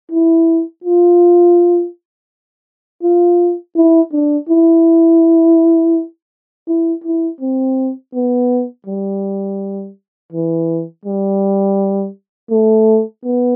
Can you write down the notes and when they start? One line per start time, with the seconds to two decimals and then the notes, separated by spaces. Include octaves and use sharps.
0.12 E4
0.84 F4
3.03 F4
3.76 E4
4.13 D4
4.49 E4
6.68 E4
7.04 E4
7.41 C4
8.14 B3
8.87 G3
10.33 E3
11.05 G3
12.51 A3
13.24 B3